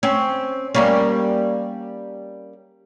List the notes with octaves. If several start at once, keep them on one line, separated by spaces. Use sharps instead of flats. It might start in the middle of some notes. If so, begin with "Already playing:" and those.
C4 C#4
G3 A#3 C#4